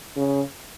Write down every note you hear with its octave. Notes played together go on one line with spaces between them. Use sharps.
C#3